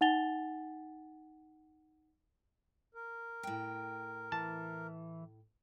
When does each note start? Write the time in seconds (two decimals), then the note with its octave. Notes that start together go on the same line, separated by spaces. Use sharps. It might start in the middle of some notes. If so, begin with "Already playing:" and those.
0.01 D#4 F#5 G#5 A6 F7 G7
2.95 A#4
3.43 A2 G5
4.32 E3 A5